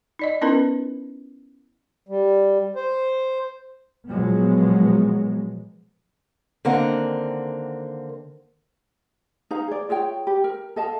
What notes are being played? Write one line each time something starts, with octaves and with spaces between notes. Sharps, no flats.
D#4 D5 D#5
B3 C#4 D#4 E4 A#4 B4
G3
C5
A#2 F3 F#3 G#3 B3
D3 D#3 A#3 C4 A#4 F#5
D#4 B4 F5 A#5
G#4 D5
F4 G#4 C#5 G5
G4 B5
A#4
A4 D#5 F5 A5